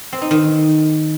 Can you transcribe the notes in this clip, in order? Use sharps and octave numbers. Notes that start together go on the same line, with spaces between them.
C4
D#4
D#3